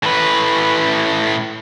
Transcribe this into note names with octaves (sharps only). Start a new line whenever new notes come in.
A2 B4